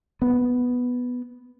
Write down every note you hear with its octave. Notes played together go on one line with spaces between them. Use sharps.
B3